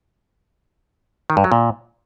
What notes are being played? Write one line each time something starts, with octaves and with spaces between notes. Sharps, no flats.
D#3
G2
F#3
A#2